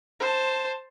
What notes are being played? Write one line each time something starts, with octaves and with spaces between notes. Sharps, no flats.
C5 A5